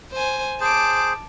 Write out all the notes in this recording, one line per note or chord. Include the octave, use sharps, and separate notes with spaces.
C5 G#5
G#4 C5 A5 D6